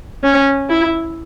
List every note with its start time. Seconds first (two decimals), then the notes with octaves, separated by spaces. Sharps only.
0.23 C#4
0.69 E4